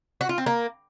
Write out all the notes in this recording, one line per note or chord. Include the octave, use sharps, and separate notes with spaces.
F#4
F4
C4
A#3